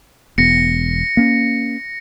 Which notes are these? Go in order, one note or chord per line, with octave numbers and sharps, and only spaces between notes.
E1 B3 A#6 C#7
A#3 C#4